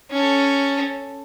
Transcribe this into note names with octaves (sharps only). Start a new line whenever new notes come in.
C#4 A4